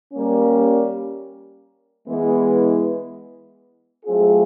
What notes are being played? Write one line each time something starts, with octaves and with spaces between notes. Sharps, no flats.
G3 A#3 C#4
E3 G#3 B3
F#3 A3 C4 F4 G#4